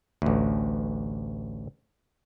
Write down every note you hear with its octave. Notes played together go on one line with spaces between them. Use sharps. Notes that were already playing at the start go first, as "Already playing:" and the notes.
A1 D2